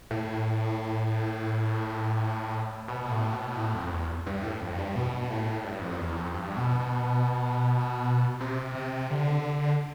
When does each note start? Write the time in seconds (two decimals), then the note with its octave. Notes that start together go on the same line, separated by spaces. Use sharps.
0.11 A2
2.88 B2
3.11 A2
3.33 B2
3.56 A2
3.74 F2
3.91 E2
4.26 G2
4.43 A2
4.61 F2
4.78 G2
4.96 B2
5.30 A2
5.64 G2
5.81 F2
5.99 E2
6.16 F2
6.34 G2
6.56 B2
6.79 B2
8.40 C3
8.75 C3
9.10 D3